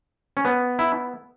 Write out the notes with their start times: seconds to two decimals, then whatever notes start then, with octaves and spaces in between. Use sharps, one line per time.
0.37 C#4
0.45 B3
0.79 E4